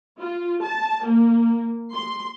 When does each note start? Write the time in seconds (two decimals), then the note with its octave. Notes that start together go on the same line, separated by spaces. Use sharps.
0.20 F4
0.63 A5
1.05 A#3
1.94 C6